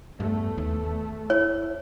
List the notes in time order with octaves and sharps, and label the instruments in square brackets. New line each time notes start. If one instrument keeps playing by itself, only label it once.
[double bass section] E2 A3 [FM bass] G2
[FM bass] D#2
[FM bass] E4 [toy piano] C#5